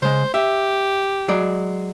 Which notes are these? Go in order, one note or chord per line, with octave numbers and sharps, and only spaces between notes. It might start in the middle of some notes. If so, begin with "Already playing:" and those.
C#3 G#3 C5
G4 E5
F#3 G#3 D5